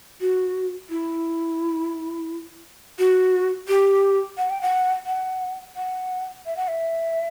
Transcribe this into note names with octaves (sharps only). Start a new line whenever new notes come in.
F#4
E4
F#4
G4
F#5
G5
F#5
F#5
F#5
E5
F#5
E5